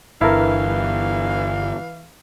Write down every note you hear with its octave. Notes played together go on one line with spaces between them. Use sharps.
G1 E3 E4 A4 A#4 F5